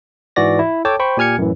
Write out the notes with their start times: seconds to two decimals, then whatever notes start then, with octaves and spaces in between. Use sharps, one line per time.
0.36 G#2 E3 F#4 D5 A#6
0.59 E4
0.85 A4 C#5 G5 A5 D6
0.99 C5 G5 B5 C#6
1.17 A#2 G4 G#5 F6 G#6 C#7
1.38 F#2 A2 E3